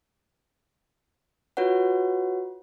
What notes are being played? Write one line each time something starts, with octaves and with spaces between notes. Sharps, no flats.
F4 F#4 B4 C#5 F#5